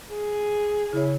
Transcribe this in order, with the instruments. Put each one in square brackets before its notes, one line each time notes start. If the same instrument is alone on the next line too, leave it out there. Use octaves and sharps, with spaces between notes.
[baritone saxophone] G#4
[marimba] C#3 C#5 [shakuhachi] E4